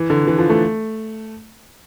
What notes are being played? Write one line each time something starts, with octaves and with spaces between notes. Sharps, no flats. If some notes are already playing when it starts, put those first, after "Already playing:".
Already playing: E3
D3
E3
F3
A3